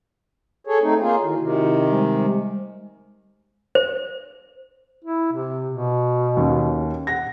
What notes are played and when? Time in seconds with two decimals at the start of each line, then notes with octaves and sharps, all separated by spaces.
0.67 G#4 A4 C#5
0.82 A3 C4 D#4
1.01 A#3 F4 G#4 C#5 A#5
1.23 D#3 E4 F#4
1.40 C3 D#3
1.90 G3 G#3 C5
3.75 C5
5.04 E4
5.33 C3
5.70 B2
6.37 D#2 C#4
7.07 F#5 A#6